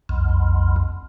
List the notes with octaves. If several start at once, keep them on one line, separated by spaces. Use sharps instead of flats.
B1 F2